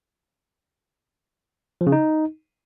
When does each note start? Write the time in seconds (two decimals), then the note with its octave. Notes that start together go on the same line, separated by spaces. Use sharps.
1.81 F3
1.87 C#3
1.92 D#4